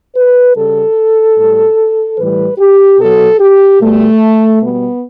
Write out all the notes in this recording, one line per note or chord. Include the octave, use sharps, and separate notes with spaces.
B4
C#3 G3 A4
A2 G3
A2 E3 G3 B4
G4
B2 F#3 A4
G4
B2 G3 A3
B2 G3 B3